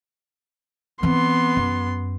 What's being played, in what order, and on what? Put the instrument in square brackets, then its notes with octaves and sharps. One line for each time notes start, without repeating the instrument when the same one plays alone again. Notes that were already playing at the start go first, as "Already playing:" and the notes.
[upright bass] E3 C4 [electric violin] B3 C6
[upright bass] F#2